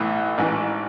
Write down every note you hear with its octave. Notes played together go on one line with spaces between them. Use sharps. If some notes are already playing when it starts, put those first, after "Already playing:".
Already playing: B1 A2 E3
A1 G#2 E3